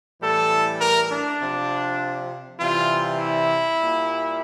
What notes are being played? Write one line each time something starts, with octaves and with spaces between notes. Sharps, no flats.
A2 E3 G3 A4
A#4
D4
C3 F3
C3 E3 G3 F4
E4
A#2 G3